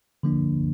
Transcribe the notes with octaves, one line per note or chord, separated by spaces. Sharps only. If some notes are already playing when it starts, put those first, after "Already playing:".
D3 F3 A#3 D4